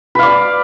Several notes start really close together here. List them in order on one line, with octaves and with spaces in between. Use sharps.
B4 F5 D5